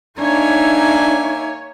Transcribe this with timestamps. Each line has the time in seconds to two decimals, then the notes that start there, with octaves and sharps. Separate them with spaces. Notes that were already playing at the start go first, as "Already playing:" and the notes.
0.20 A#3 D4 D#4 C#5 E5 G#5